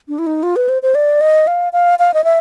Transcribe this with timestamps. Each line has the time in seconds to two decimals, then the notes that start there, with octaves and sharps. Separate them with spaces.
0.08 D4
0.19 E4
0.27 D#4
0.43 F4
0.56 B4
0.69 C5
0.82 C5
0.95 D5
1.21 D#5
1.47 F5
1.73 F5
1.99 F5
2.14 D#5
2.24 E5